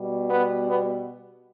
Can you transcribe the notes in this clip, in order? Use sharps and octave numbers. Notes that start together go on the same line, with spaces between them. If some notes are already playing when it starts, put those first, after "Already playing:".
Already playing: B2 G3
B3
B3